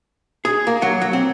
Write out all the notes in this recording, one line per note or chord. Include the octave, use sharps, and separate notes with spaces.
G#4
A#3
F#3
F#3
C4